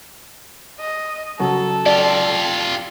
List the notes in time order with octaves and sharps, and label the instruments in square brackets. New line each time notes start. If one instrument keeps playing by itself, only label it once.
[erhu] D#5
[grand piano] C#3 F#3 F#4 [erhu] A4
[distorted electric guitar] F4 G4 [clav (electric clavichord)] D5